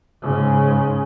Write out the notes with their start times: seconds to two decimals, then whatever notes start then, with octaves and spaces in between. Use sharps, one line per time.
0.22 G#2 C#3